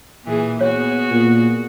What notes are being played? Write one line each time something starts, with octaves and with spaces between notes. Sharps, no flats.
A#2 E3 G#4
B3 F#4 G#4 C#5
A#2